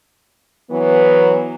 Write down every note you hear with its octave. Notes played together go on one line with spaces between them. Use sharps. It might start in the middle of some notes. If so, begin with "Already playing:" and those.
E3 F#3 B3